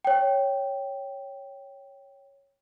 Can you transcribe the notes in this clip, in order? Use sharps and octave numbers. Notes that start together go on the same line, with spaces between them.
C#5 G5